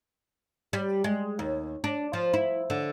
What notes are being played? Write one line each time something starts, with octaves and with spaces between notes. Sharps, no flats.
G3
G#3
D#2
D4
F3
E4
D3